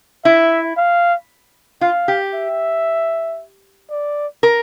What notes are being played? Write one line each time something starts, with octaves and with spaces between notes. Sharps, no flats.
E4 E5
F5
F4 F5
G4
E5
D5
A#4